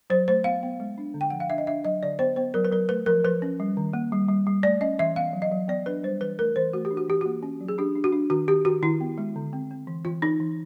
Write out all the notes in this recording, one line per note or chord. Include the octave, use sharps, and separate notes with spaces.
F#3 C5
A3 C5
B3 F5
B3
G#3
D4
D3
G5
F3 F#5
F5
D4 E5
D#5
D4 E5
F#3 D#5
D3 D5
B3 C5
B3 C5
F#3 A#4
B4
F#3 A#4
A3 B4
F3 A#4
F3 B4
C#4
G3
D#3
A#3
G3
G3
G3
A3 D5
C#4 D#5
E3 E5
B3 F5
F#3
D#5
F#3
B3 D5
D4 B4
G3 C5
E3 B4
A3 A#4
E3 C5
A3 F#4
G4
D4
F#4
E3 G4
A#3 F#4
C#4
F#3
G#4
D4 G4
D4
F#4
D4
D#3 F#4
D#3 G4
D#3 F#4
D#3 E4
B3
G#3
D3
C4
C4
E3
E3 F4
E3 D#4
E3